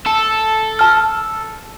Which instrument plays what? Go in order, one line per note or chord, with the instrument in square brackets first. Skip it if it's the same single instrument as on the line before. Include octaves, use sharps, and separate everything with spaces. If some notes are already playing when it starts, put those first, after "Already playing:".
[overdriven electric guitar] A4
[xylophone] A5 F6